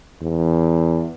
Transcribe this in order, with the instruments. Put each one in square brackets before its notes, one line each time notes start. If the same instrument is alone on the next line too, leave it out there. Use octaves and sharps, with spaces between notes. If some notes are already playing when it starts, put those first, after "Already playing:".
[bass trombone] E2